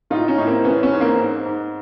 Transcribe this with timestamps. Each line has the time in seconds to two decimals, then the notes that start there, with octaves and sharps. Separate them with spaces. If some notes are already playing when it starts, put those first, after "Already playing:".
0.10 A2 D#4 F4
0.28 C#4 D#4
0.38 A2
0.47 A#3 C4
0.64 E3 B3 C#4
0.83 B3 C#4
0.92 G#2
1.00 A#3 C4
1.19 G#2
1.45 G#2